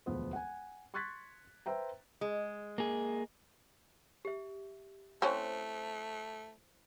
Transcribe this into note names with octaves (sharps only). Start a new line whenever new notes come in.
E1 D2 F3 B3 C5
F#5 G#5
C6 C#6 F#6 G#6 A6 B6
B4 C5 E5 G5 A#5
G#3
A#3 G#4
G4 E5
A3 C4 C#4 E4 C5